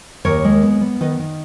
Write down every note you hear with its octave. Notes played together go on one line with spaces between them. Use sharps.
D#2 A#4 C#5
G#3
B3
B3
D#3 B4 D#5
D#3